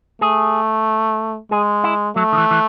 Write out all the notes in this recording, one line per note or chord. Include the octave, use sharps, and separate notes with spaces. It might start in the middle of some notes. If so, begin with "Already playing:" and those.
A3 G#4
G#3 G#4
E4
F#3 A3
D#3
E3
E3